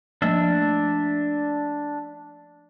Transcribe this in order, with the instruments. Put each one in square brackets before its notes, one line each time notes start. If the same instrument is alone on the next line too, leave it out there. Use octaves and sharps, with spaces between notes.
[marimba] F3 A3 A#3 [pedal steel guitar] D4 E5